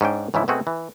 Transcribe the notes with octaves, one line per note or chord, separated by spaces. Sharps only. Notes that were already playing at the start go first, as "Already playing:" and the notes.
G#2 C#4 D4 G5
G#2 C#3 E3 F3 E4
B2 A3 C4 F#4 G#4
E3